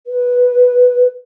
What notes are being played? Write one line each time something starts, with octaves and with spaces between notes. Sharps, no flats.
B4